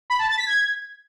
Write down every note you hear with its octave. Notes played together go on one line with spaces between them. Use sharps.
B5
A5
A6
B6
G#6